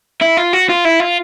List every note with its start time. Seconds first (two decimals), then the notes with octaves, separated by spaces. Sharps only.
0.21 E4
0.37 F4
0.53 F#4
0.69 F4
0.85 E4
1.00 F4